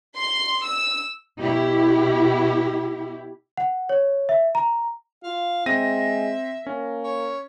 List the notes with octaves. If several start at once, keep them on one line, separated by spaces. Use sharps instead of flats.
C6
E6
B2 E4 G4
F#5
C#5
E5
A#5
F4 F5
G#3 C4 E5 A#6 D#7
A#3 C#4
C#5